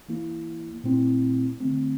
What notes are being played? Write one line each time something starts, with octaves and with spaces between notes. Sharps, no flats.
E3 A#3 E4
A#2 A3 C4 E4
D3 A3 C4